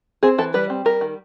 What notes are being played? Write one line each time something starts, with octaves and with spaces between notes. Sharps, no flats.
C4 G#4
E3 A4
G3 B4
C4
G3 A#4
D#3